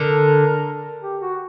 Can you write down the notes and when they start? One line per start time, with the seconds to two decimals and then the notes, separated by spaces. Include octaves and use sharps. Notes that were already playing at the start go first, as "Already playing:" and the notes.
Already playing: D3 A#4
1.03 G4
1.22 F#4